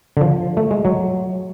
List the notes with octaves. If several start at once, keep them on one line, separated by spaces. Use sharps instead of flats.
D3
F3
A3
G#3
F#3